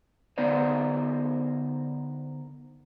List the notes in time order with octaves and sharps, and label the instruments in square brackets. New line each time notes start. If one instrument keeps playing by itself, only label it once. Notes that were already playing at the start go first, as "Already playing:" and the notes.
[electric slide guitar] D3 B3 D#4 A#4 C5 D5